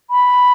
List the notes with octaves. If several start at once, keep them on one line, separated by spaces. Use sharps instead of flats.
B5